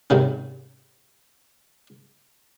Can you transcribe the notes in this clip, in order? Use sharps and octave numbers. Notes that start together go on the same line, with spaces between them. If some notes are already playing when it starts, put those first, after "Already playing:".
G#2 C3 D#3 C#4